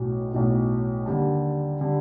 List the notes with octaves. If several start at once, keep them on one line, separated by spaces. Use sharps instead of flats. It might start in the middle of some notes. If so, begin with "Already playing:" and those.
Already playing: B1 A2 F#3
B1 A2 F#3
D#2 D3 G3
D3 G3